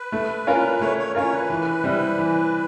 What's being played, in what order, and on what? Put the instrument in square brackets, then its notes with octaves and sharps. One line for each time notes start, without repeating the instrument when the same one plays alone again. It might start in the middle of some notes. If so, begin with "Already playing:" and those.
Already playing: [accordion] B4
[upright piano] A3
C#4 F4 A#4
[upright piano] A3 [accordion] C#5
[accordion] C#5
[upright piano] C#4 F4 A#4 [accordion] C#5
[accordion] B4
[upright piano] E3
G3 C4 E4
E3